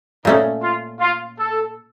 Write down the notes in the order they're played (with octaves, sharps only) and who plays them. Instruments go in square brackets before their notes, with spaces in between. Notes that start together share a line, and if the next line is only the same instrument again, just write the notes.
[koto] A#2 A3 C#4 [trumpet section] D#4
[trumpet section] F4
F4
A4